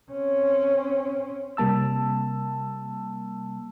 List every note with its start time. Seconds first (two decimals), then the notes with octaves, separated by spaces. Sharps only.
0.12 C4 C#4
1.57 C3 G3 A#3 A5 E6